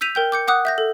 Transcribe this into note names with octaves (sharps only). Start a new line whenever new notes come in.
E6 G6 B6 D#7 F7
A#4 G5 G6
D6 G6 C#7
F#5 D6 D#6 F#6
E5 G6 A#6
A4